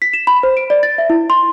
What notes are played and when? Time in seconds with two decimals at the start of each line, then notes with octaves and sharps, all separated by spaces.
0.02 B6
0.13 E7
0.27 B5
0.43 C5
0.57 D7
0.70 D5
0.83 A6
0.98 E5
1.10 E4
1.30 C6